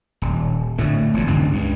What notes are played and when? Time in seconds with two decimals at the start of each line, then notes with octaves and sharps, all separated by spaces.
0.22 D#1
0.78 A2 D3 A3
1.14 E1 E2 D3
1.29 G2 D3 C4
1.49 C#2 G2